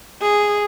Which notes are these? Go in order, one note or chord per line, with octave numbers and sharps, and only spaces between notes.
G#4